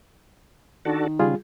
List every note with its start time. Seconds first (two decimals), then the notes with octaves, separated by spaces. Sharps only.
0.85 D#3 D4 F#4 A4
1.19 C#3 G3 F4 G#4